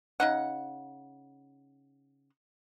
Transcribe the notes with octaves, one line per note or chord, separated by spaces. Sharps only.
C#3 D#4 F#5